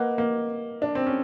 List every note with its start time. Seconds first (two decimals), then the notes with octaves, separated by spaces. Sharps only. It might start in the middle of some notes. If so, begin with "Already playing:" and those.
Already playing: A#3 B4 D#5 F#5
0.18 A#3
0.82 D4
0.95 C4
1.07 C#4